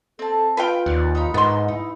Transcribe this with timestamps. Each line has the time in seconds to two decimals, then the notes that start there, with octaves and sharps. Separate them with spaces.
0.19 C4 A4 A5
0.57 F4 B4 F5 G5
0.86 D#2 F#4 D5 F6
1.15 D#4 A#5 B5
1.34 G#2 B3 D#5 C6
1.68 D#4 E4